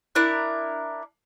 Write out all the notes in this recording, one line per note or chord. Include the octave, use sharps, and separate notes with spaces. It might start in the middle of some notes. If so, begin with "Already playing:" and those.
D4 E4 A#4 F#6